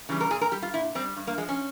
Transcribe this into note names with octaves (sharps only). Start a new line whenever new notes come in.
C#3 E3 G3
A#4
A#2 G#4
A#4
G3 G4
F4
A#2 E4
G3 C4
G2
A#3
F3 G#3
C#4